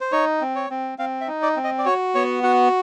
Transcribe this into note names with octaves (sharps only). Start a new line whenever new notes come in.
C5
D#4 C#5
C4
C#5
C4
C4 F5
E5
D#4
D5
C4
D#5
D5
F#4 C#5
B3 C#5
F#4 F#5